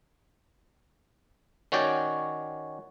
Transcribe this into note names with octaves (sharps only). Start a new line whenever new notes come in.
D#3 C#4 F#4 C#5 D5 G5